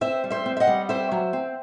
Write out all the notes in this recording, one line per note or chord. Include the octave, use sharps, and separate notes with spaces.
C4 C5 E5
G3
C5 E5
C4
E5
D#5 F#5
G3
C4 C5 E5
F#3
C4